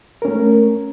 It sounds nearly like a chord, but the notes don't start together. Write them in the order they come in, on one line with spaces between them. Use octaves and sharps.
A#4 C#4 A3